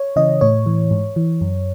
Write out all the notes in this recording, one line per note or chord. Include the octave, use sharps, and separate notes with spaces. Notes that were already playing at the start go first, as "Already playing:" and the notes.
Already playing: C#5
C#3 E3 D#5
A2 C#5
E3
G#2
E3
F#2